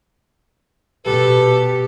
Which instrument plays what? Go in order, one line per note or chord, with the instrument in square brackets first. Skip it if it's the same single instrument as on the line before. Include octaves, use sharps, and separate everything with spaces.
[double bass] B2 [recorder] G4 [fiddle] A4 [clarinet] B4